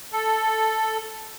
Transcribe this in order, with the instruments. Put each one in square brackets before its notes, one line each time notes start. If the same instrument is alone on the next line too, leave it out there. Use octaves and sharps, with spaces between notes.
[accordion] A4